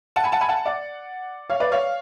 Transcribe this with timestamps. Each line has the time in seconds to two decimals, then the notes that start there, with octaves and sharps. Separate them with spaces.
0.16 F#5 A5
0.24 G#5 B5
0.32 F#5 A5
0.41 G#5 B5
0.49 F#5 A5
0.66 D5 F#5
1.50 C#5 F5
1.60 B4 D5
1.71 C#5 F5